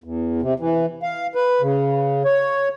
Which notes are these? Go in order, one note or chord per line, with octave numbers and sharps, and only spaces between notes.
E2
C3
E3
F5
B4
C#3
C#5